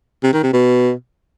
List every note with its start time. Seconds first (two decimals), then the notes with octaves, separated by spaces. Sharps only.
0.24 C3
0.34 D#3
0.43 C3
0.53 B2